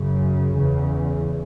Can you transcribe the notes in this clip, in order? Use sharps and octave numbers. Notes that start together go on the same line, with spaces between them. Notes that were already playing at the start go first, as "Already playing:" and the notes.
Already playing: F#2 C#3
E2 C#3